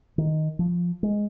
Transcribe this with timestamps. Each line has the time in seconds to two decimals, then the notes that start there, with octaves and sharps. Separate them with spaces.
0.18 D#3
0.59 F3
1.03 G#3